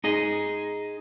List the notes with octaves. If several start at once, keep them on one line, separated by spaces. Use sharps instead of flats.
D#4 G#4 D#5